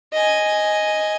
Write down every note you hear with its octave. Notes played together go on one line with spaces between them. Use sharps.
D#5 G#5